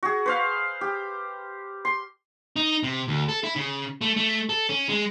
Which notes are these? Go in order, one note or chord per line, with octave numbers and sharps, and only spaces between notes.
F#4 G#4
B4 C5 F5
G4
C6
D#4
C3
D2
A4
E4
C#3
A3
A3
A4
C#4
G#3